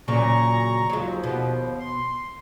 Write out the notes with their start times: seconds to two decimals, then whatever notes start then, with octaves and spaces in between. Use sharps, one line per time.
0.08 A#2 C#3 F#3 A#5 C#6
0.90 D#2 F3 F#3 G#3
1.23 B2
1.79 C6